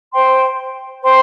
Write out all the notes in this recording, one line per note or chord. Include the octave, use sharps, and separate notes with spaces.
C5 G5 C6
C5 G5 C6